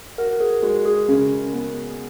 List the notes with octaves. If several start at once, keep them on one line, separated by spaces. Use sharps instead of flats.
F#4 A#4
G#4
G#3 F#4
G#4
C#3 C#4
B3